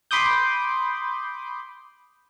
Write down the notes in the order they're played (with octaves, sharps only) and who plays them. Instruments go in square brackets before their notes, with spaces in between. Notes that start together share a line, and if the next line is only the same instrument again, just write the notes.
[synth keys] B5 C6 D6 D#6 G6